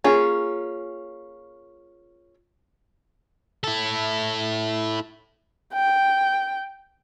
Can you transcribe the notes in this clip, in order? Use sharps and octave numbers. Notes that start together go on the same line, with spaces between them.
A#3 C#4 F4 G#4
E4 A4
G5